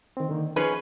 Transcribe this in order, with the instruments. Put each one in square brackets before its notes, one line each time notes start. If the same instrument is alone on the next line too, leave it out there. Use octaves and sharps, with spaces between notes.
[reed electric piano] D#3 C4
D3 D#3 A#3
[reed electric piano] F3 D#4 [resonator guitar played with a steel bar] C#4 G#4 B4